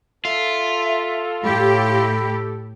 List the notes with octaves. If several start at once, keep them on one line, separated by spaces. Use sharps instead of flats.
F4 A4 E5
A2 G4 B5